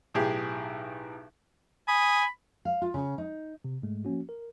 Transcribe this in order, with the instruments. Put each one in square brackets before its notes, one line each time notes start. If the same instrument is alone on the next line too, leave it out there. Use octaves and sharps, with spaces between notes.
[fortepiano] B1 A2 G4 G#4
[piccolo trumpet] G#5 [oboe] B5 [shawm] D#6
[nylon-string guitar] F5
F4
C#3
D#4
[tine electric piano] C3
G#2 G#3 A3
F3 A#3 C#4 F#4
A#4